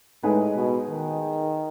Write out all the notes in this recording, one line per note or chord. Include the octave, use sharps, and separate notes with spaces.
A2 G#3 D#4 G#4 B4
B2
D#3